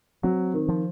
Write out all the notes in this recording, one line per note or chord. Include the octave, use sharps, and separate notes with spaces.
F#3 C4
D#3
F3